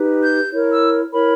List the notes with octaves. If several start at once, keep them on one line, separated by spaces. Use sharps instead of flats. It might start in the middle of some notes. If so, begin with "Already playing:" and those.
Already playing: D#4 G4 B4
G6
E4 A#4 C#5
E6
E4 A#4 C#5 B5